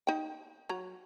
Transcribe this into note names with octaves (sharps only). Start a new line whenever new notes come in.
D#4 G5
F#3 A#5